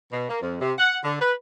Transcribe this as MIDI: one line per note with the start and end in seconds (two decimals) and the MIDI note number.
0.13 0.28 47
0.30 0.41 58
0.42 0.56 41
0.61 0.73 48
0.78 0.97 78
1.04 1.17 50
1.20 1.33 71